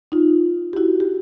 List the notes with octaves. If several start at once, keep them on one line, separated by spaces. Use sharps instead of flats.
D#4 F4
G4
E4 F#4
G4